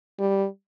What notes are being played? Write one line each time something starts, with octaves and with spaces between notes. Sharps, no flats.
G3